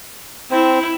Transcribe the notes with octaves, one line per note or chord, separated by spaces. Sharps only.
C4 E4